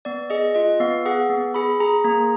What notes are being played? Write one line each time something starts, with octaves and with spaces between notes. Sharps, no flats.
B3 D5
G#4 D#5
F4 D#5
B3 F5
G#4 F#5
B3
G#4 B5
G#4 A#5
A#3 A#5